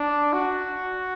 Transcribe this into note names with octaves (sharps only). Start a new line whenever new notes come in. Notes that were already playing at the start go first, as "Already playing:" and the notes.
Already playing: D4
F#4